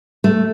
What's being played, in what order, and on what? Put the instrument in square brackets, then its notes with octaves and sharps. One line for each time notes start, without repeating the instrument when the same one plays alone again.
[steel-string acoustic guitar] A3